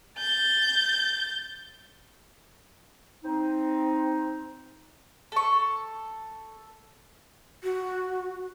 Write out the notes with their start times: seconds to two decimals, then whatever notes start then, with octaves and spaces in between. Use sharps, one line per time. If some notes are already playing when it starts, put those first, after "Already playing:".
0.18 G6 A6
3.24 C4 D#4
5.32 A4 C#6
7.64 F#4